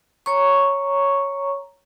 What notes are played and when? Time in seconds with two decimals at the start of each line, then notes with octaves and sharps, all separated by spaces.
0.26 C#5 A#5 C#6